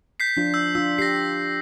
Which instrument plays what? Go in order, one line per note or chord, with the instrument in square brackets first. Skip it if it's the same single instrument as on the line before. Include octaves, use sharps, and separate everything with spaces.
[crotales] G6 B6 C7
[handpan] F3 D4 F4
[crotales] E6 G6
[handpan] D4 F4 [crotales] E6
[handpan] G4 [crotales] A#6 C7